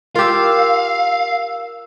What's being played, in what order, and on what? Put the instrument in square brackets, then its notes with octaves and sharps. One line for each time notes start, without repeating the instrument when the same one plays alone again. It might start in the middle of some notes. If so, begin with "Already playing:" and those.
[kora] F4 G4 [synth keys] A#4 E6 [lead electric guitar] F5